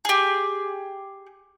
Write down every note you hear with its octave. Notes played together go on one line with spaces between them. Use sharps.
G4 G#4